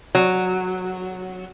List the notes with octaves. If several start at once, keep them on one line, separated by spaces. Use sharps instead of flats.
F#3